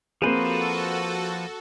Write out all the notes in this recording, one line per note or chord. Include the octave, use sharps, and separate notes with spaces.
F3 A#3 C4 F#4 G#4 A4 B4 C5